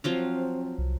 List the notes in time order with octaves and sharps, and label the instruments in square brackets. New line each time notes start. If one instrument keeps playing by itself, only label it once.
[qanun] F3 F#3 F4 [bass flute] C4
[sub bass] C2